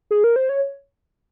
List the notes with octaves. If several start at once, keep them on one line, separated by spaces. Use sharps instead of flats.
G#4
A#4
C5
C#5